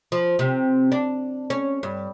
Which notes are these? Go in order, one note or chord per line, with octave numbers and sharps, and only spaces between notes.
F3
C3
D4
C#4
G2